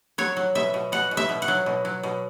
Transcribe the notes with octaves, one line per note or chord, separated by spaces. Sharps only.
F#3 C#5
F#3
B2 E5
B2
B2 F#5
B2
E5
B2
F#5
F#3
B2
F#3
B2